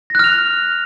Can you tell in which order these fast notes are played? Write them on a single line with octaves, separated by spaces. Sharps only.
A#6 F#6 F6 F7